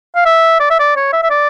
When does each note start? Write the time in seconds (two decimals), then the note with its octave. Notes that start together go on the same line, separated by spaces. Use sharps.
0.16 F5
0.25 E5
0.60 D5
0.70 E5
0.79 D5
0.96 C#5
1.13 E5
1.23 E5
1.30 D5